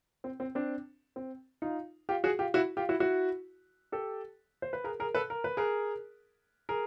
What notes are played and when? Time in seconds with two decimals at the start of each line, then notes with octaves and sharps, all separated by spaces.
0.24 C4
0.40 C4
0.55 C4 D4
1.16 C4
1.62 D#4 F4
2.09 F4 G4
2.24 F#4 G#4
2.39 F4 G4
2.54 E4 F#4
2.77 F4 G4
2.89 E4 F#4
3.00 E4 F#4
3.92 G4 A4
4.62 C5
4.73 B4
4.84 G#4 A#4
5.00 G#4 A#4
5.15 A4 B4
5.30 A#4
5.44 B4
5.57 G#4 A#4
6.69 G#4 A#4